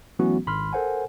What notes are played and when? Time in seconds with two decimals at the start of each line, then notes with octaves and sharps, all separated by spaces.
0.19 E3 F#3 A3 B3 C#4 F#4
0.47 G#1 B5 C6 F6
0.73 A4 A#4 C5 F#5 G#5